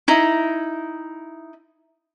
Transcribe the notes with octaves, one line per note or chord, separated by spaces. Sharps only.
D#4 E4